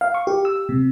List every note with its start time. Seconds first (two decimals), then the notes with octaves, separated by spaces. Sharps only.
0.01 F5
0.14 C#6
0.27 G4
0.45 E6
0.69 C3